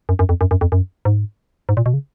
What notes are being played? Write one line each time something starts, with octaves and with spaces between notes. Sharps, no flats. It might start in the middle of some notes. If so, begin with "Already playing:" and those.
F#2
F#2
F2
F#2
F#2
F2
F#2
G#2
G#2
A#2
B2
C#3